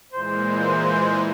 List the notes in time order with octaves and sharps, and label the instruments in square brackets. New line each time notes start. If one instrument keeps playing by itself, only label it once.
[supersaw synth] A#2 E3 G#3 [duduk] C5